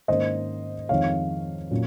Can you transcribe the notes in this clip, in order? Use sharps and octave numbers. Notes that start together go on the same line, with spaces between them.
G#2 D#3 A#3 C#4 C5 D#5
F2 D#3 G#3 C#5 F5
A#2 F#3 C#4